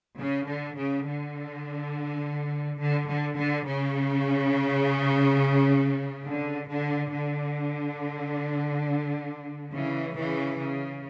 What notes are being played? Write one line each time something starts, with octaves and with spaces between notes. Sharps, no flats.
C#3
D3
C#3
D3
D3
D3
D3
C#3
D3
D3
D3
C#3 E3
C#3 E3
C#3